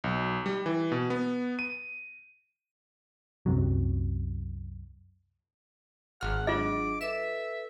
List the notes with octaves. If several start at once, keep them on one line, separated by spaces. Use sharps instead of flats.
B1
G3
E3
B2
B3
D#7
C2 F#2 C3 F#3
G#1 G#4 F#5 F6
F#3 D4 F4 G#4 D#5 D6
A4 B4 E5 E7